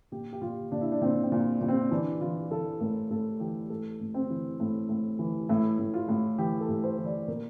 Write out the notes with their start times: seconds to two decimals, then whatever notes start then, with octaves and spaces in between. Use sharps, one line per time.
0.12 A#2 G4
0.33 G4
0.41 A#2 F4
0.72 A#2 D4
0.81 E4
0.92 D4
1.01 A#2 C4
1.23 C4
1.32 A#2
1.61 A#2
1.68 C4
1.91 E3 D4
2.21 E3 F4
2.51 E3 A4
2.80 A2 A#4
3.10 A2 A4
3.40 E3 G4
3.70 A2 A4
4.00 A2
4.14 C4
4.30 E3
4.60 A2
4.89 A2
5.19 E3
5.49 A2 E4
5.78 A2
5.94 F4
6.09 A2
6.38 E3 G4
6.61 A4
6.68 A2
6.84 C5
6.98 E3
7.05 D5
7.28 A#2 A#4